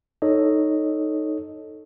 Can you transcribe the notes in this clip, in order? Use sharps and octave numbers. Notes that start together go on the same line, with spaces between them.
D#4 A4 C#5 D#5